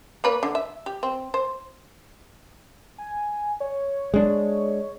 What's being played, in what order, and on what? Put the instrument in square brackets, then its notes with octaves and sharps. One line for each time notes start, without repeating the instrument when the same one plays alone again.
[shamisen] A#3 B4 C#5
D3
E5
G4
C4
C5
[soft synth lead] G#5
C#5
[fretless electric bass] G#3 D4